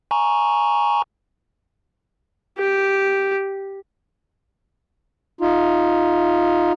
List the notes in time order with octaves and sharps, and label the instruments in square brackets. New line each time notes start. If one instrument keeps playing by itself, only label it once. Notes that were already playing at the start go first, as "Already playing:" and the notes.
[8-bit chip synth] G#5 A#5 C#6
[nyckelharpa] G4
[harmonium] D#4 F4